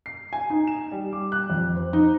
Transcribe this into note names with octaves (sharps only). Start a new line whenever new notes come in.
C7
G#5
D#4
E7
G3
D6
F#6
F2
C5
D#4